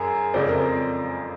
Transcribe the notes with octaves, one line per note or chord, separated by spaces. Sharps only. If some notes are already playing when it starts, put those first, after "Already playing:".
Already playing: F#2 G#4 A#4
F2 C#3 F3 G#3 C4 C5 D5
A#4